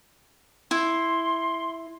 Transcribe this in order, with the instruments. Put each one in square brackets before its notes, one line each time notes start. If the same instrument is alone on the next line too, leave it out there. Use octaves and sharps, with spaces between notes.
[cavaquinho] E4 [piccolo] C6